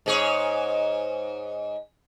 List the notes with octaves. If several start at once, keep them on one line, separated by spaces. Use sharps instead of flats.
G#2 G#4 C#5